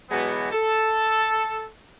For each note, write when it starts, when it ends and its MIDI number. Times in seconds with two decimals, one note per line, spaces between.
0.10 0.49 47
0.10 0.49 52
0.10 0.49 54
0.10 0.49 56
0.10 0.49 59
0.52 1.66 69